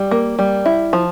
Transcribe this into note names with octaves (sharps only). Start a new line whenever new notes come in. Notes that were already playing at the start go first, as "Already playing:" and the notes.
Already playing: G3
A#3
G3
E4
F3